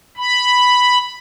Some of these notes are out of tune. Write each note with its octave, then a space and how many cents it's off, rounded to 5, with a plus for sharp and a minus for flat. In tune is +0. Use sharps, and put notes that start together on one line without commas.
B5 +0